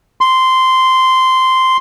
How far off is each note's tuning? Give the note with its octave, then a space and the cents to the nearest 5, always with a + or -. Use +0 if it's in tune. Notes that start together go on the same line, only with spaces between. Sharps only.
C6 -10